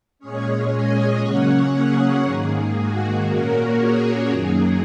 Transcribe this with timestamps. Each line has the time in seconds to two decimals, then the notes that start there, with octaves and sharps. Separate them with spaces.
0.19 A#2 G#3 C#4 G#4 C#5
0.71 D#5 G#5
1.21 C#3 F#3 A#3 C#4 C#5 F#5
1.73 G#4 C#5
2.25 G#2 D#3 A#3 G#4
2.76 F#4
3.26 A#2 A#3 C#4 F#4 A#4
3.77 G#4 C#5
4.29 F#2 D#3 F#3 A#3 G#4